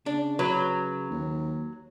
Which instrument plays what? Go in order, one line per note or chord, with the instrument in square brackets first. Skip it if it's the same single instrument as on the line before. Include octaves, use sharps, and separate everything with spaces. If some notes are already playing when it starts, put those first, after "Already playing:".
[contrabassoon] C#3 [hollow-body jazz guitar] D4
[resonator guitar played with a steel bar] F#3 [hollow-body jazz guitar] B4
[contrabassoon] D#2